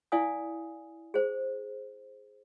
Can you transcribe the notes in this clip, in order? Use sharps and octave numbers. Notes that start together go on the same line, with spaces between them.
E4 D5 F5 G#5 D#6
G#4 C5